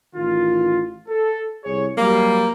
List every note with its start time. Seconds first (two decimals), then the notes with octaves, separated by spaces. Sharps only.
0.15 A1 D#3 F4
1.09 A4
1.64 C2 G#4 C#5
1.98 F#3 G3 A#3